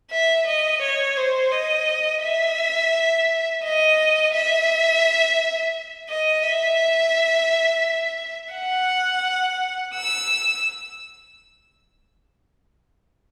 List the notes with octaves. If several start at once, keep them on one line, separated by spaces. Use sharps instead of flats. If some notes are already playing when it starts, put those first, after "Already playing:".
E5
D#5
C#5
C5
D#5
E5
D#5
E5
D#5
E5
F#5
E6